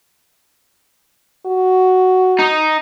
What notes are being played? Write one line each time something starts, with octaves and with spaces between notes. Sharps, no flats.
F#4
D#4